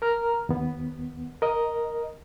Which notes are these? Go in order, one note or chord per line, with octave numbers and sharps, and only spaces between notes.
A#4 A#5 F6
D#2 B3
A#4 D#5